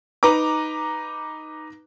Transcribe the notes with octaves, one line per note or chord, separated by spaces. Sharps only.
D#4 B4 A#5 D6